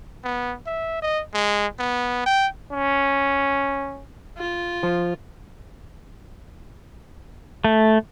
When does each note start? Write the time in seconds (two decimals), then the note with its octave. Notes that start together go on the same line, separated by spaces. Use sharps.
0.25 B3
0.67 E5
1.02 D#5
1.34 G#3
1.79 B3
2.26 G5
2.73 C#4
4.38 F4
4.83 F3
7.64 A3